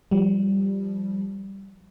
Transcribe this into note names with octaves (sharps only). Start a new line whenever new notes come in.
F3 G3